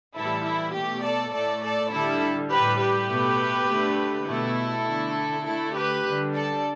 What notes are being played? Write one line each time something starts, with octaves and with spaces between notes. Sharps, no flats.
A2 E3 G3 E4 A4
E4
B2 A3 G4
A4 D5
A2 A3 A4 D5
A4 D5
D3 G3 E4 A4
A2 G3 G4 B4
G4 B4
B2 A3
D3 A3
B2 A3 E4 A4
D3 A3
D3 A3 E4 A4
G4 B4
D3 G3
A4 D5